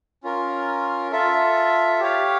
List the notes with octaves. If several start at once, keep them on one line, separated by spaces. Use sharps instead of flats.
C#4 F4 A#4
F4 A4 E5
G4 C#5 F5